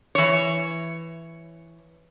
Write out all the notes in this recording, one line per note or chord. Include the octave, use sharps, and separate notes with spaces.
E3 C#5